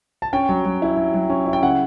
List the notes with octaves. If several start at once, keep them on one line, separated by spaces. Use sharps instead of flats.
A5
C#4 G5
F#3
F#3
E4
F#3
F#3
C#4
E4
G5
C#3 F#5